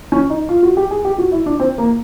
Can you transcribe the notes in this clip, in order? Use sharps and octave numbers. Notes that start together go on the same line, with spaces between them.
C#4
D#4
F4
F#4
G4
G#4
G4
F#4
E4
D4
C4
A#3